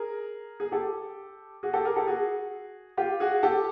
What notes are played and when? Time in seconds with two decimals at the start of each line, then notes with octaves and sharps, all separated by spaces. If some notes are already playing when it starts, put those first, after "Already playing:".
Already playing: G#4 A#4
0.60 G#4
0.72 G4 A4
1.63 F#4 G#4
1.73 G4 A4
1.85 G#4 A#4
1.96 G4 A4
2.07 F#4 G#4
2.97 F4 G4
3.20 F#4 G#4
3.43 G4 A4